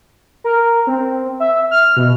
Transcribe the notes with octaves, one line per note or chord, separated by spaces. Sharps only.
A#4
C4
E5
F6
B2